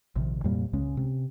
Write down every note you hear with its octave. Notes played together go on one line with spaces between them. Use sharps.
A#1 C3 D#3
F2 A#2 G3 A#3
C#2 C#3 G#3 C#4
C3